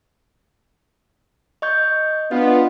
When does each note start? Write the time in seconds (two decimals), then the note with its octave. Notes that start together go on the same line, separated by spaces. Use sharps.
1.62 D#5 C#6 G6
2.31 B3 D4 F4 D#5